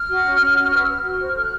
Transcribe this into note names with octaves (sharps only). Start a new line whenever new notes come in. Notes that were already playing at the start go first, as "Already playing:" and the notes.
Already playing: F6
F#4
C#4
C#4
F#4
B4
E6
B4 F6
F#4
C5
A4
F#6